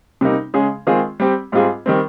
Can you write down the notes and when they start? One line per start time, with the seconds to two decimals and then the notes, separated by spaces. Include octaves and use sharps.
0.21 C3 G3 A#3 D#4
0.54 C#3 G#3 C#4 G#4
0.87 D#3 G#3 C4 F4 G#4
1.20 G3 C4 G4
1.52 G#2 G3 C4 F4 G#4
1.86 D#3 G3 C4